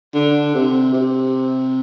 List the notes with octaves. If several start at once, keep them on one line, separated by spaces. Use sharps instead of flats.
D3
C3
C3